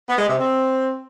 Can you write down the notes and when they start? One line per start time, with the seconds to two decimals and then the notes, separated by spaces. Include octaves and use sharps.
0.08 B3
0.18 G#3
0.28 C3
0.38 C4